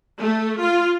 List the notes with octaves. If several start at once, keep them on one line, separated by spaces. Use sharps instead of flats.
A3
F4